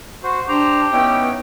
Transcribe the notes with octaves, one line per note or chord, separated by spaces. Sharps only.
F#4 C5
D4 G4 C5 A#5
B3 C#4 D#4 E4 G5